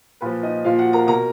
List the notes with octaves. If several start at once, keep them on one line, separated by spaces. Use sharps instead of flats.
A#2 F3 B4 B5
D#4 D#5
A#2 F3 F4 F5
F#4 F#5
A#4 A#5
B2 A#4 A#5